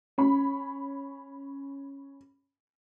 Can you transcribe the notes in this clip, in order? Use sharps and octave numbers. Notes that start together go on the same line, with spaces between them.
C#4 B5